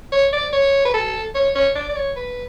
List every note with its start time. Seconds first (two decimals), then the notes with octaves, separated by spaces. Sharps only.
0.12 C#5
0.33 D5
0.53 C#5
0.85 B4
0.94 A4
1.35 C#5
1.55 C#5
1.75 D5
1.89 D5
1.96 C#5
2.16 B4